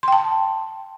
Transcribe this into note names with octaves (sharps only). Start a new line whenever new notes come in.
G5 A5 C6